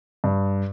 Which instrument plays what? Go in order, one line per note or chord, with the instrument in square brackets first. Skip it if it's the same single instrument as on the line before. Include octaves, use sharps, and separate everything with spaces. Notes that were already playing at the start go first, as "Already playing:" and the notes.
[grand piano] G2